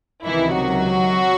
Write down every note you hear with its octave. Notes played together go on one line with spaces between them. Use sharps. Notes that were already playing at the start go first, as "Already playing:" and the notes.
C#2 C3 D#3 E3 E4
F#3 F#4